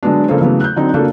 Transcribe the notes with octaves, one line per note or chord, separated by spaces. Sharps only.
D3 F#3 G#3 B3 D4
C#3 F3 A#3 A4 C5
C#3 E3 F#3 A3 B3
F#6 G6
D3 F#3 C4 D#4
C#3 A#3 D4 F4 F#4 A4